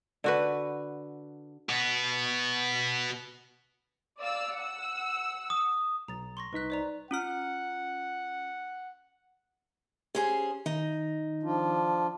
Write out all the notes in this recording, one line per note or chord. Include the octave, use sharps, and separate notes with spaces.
D3 F#4 B4
B2 B3
D5 F5 E6
F#5 E6
D#6
B1 A#5 A6
C6 C#6 A#6
C2 D#4 B4 F#6 B6
C5 D5 A#5
C#4 F4 F#5 F6
C#4 G4 G#4 C5
D#3 D#4
F3 D4 F4